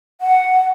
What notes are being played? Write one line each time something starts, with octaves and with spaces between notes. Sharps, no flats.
F#5